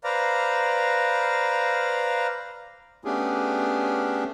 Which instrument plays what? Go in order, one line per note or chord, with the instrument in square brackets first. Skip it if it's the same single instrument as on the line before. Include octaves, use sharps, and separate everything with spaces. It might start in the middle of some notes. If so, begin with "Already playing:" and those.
[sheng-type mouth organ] B4 C5 D5 F5 A#5
[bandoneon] A3 B3 C#4 D4 G4 G#4